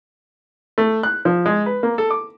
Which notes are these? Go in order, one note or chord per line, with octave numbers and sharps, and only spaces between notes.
A3
F#6
F3
G#3
B4
A#3
A4
D6